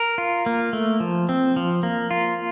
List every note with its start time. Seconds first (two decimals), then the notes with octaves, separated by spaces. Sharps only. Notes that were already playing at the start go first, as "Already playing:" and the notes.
Already playing: A#4
0.18 F4
0.46 A#3
0.73 A3
1.00 F3
1.29 C4
1.56 F3
1.83 A#3
2.11 F4